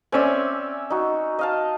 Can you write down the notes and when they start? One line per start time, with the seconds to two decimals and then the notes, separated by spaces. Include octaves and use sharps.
0.12 C4 C#4 D5 E5 G#5
0.90 D#4 F#4
1.39 D#5 F5 A5